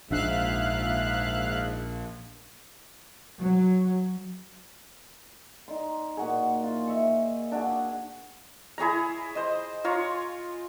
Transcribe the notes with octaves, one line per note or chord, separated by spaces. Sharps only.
A#1 G#2 D4 E5 F5 F#6
F#3
D#4 D5 C6
A#2 F#4 G#4
F4
D#5 E5 C#6
D4 F#4 G#4
E4 G#4 C#5 A#5
C5 D#5
F4 C#5 A#5 C6